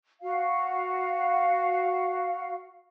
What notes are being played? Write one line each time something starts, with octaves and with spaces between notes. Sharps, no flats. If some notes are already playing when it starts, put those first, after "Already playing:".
F#4 F5